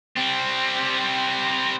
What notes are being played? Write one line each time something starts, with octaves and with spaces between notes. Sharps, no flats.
G3 C4